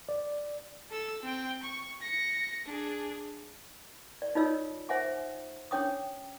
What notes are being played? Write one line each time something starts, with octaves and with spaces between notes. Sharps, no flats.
D5
A4 E6
C4 G5
C#6
A#6 C#7
D4 G#4
D5
D#4 F4 A4 C#5 D#5 E6
C5 E5 F#5 G#5 D6
C#4 D4 C#5 G5 D6 D#6